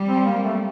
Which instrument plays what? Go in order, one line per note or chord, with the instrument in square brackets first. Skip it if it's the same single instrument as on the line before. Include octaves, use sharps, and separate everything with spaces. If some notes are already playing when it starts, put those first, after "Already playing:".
Already playing: [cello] G3
[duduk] C4
A#3
A3